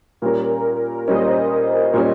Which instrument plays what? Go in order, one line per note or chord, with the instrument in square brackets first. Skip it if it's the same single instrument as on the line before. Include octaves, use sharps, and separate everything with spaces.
[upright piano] A#2 G3 C#4 [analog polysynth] A#4
[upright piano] A#2 G3 C#4 [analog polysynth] C5 D#5
[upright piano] A#2 G3 C#4